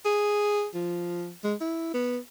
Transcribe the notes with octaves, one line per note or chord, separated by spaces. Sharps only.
G#4
F3
G#3
E4
B3